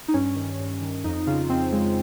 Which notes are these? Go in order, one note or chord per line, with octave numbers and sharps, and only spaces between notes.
D#4
G2 C#4
D#3
G2
D#3
F2 D#4
C#3 F4
F2 C4
C#3 G#3